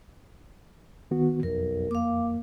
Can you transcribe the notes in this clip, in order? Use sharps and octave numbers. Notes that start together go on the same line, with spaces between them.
D#3 B3 F#4
B1 F2 A#4
A#3 F5 D6